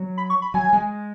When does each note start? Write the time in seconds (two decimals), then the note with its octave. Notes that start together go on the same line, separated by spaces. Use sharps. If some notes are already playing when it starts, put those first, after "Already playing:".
Already playing: F#3
0.18 B5
0.30 C#6
0.42 B5
0.54 F#3 G#5
0.73 G#3